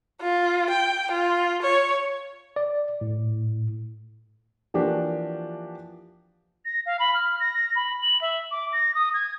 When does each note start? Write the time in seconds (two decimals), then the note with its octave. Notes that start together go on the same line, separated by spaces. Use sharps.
0.21 F4
0.70 G5
1.11 F4
1.62 C#5
2.56 D5
3.01 A2
4.74 E3 F3 A#3 D4 F#4 G4
6.65 A#6
6.86 F5
6.99 B5
7.14 F6
7.40 A#6
7.76 B5
8.02 F#7
8.21 E5
8.51 D6
8.73 A#6
8.95 D#6
9.14 G#6